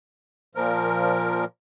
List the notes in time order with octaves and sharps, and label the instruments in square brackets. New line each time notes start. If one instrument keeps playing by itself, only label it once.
[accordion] A#2 F3 A#4